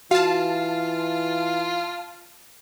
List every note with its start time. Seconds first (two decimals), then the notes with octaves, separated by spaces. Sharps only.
0.11 E3 F4 F#4 F5 A5